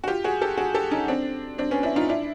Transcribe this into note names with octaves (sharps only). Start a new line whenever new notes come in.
F#4
F4 G4
F#4 G#4
G4 A4
F#4 G#4
G4 A4
C#4 D#4
C4 D4
C4 D4
B3 C#4
D4 E4
D#4 F4
D4 E4